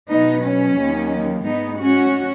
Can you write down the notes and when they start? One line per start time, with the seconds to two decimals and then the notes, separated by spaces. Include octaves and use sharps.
0.09 B2 F#3 B3 D#4
0.44 C#4
0.77 D#2 D#3 F#3
1.45 G#2 G#3 B3 D#4
1.79 C#4 F#4